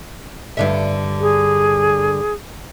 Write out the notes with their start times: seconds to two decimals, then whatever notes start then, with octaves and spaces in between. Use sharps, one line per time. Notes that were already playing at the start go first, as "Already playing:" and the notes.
0.57 G2 D3 E5
1.21 G#4